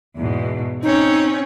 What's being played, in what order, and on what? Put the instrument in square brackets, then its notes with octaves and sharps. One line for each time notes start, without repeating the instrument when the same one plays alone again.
[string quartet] E2 G#2 B2
[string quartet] C4 C#4 C#5 [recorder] D#4